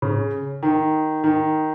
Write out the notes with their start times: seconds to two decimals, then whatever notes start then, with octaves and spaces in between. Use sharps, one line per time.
0.02 C#3
0.63 D#3
1.24 D#3